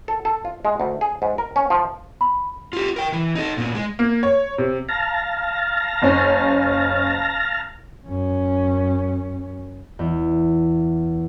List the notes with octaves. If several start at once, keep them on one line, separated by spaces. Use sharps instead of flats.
A4
A4
F4
G#3
D2
G#4
G#2
A#4
C#4
F3
B5
F4 G4
A#4 G5
E3
D#4 A4
A#2 B3
G#3
A#3
C#5
C3
F5 A5 A#5
F#1 C#4
F#2 C#4
E2